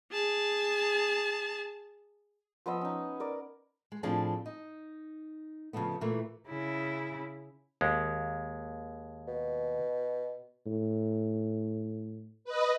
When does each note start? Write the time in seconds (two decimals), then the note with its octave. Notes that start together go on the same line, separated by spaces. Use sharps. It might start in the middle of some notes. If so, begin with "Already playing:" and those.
0.12 G#4 A5
2.66 F3 B3 D#5 E6
2.81 C#4 D#4
3.20 A#4 D5
3.92 G#3
4.03 A2 F3 C4 D4 G#4 A5
4.46 D#4
5.73 C#3 F3 G3 A3 B3
6.01 A#2 E3 A3
6.48 C#3 E4
7.81 D#2 G#3
9.27 B2
10.66 A2
12.44 B4 D#5